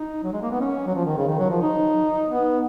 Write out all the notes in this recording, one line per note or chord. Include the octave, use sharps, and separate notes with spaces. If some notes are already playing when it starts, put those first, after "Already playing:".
Already playing: D#4
F#3
G#3
A#3
B3
C#4
F#3
F3
D#3
C#3
D#3
F#3
F3
D#4
B3